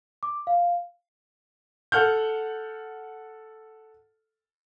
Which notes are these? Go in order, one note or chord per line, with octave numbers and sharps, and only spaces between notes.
D6
F5
A4 F#5 F6 G6